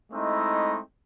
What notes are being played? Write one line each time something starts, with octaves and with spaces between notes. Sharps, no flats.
G#3 A3 C4 D#4 E4